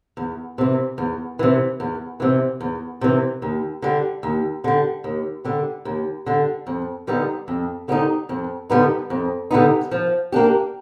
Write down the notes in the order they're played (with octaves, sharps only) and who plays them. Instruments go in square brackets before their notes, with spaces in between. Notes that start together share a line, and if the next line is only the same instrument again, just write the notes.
[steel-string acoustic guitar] E2
C3 E3
E2
C3 E3
E2
C3 E3
E2
C3 E3
D#2
D3 G3
D#2
D3 G3
D#2
D3 G3
D#2
D3 G3
F2
D3 G3 B3 D#4
F2
D3 G3 B3 D#4
F2
D3 G3 B3 D#4
F2
D3 G3 B3 D#4
F3
A#3 D4 G4